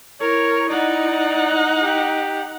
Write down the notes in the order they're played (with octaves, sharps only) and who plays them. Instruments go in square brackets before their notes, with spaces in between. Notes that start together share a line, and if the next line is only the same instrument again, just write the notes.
[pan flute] E4 [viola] A#4 [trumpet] C#5
[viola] D#4 F#5 [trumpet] D5
[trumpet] G4